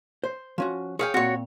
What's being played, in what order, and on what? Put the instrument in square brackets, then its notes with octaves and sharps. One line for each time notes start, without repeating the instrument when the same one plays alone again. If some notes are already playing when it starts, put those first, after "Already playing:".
[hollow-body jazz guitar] C5
F3 C#4 F#4
[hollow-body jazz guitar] G#4 E5 G#5 [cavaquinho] C#5 F5 G5
[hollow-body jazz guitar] A#2 C4 [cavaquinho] F#4 C#5